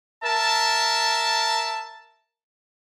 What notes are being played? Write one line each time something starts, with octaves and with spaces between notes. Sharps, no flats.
A#4 E5 A5